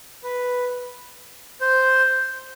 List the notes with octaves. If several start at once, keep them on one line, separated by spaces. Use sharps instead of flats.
B4
C5